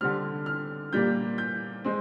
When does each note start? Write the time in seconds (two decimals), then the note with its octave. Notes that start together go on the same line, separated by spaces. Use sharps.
0.01 D3 G3 C4 F6
0.46 F6
0.93 A#2 G3 A#3 G6
1.38 G6
1.84 G#3 C4